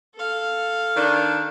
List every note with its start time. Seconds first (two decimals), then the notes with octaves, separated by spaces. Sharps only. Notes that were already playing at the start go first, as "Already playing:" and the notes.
0.15 A4 F5
0.96 D#3 D4